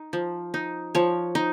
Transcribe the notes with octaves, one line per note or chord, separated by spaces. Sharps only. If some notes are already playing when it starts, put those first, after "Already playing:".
Already playing: D#4
F3
D#4
F3 C#5
D#4